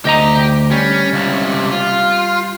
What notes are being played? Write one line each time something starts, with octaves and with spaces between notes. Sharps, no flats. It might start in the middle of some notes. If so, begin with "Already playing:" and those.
D2 G4 D#5 A#5
G3 C#4
C#2 C3
F4